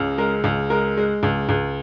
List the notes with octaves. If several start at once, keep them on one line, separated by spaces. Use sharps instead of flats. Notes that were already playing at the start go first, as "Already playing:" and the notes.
Already playing: C#2 C#3
G#3 A#4
C#2
G#3 A#4
G#3
C#2
C#2